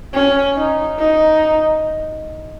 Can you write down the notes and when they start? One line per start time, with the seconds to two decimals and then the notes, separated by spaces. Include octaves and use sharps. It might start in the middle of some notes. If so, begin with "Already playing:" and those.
0.14 C#4
0.56 D#4
0.99 D#4